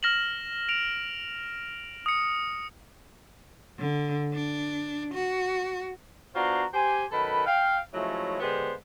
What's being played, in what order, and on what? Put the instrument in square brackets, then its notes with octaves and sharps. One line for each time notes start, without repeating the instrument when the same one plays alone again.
[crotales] F6 A#6 E7 F#7
D7 F7
D#6 C#7
[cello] D3
D4
F#4
[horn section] B3 D4 F4 F#4 C5 A#5
G4 C5 G#5
F#2 D#3 A4 B4 B5
F5 G5
F3 F#3 G#3 A3 C#4 E4
D3 G#3 B3 G4 C5